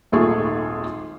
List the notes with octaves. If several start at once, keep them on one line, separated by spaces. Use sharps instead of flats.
D#1 G#1 A3 F4 G#4 C#6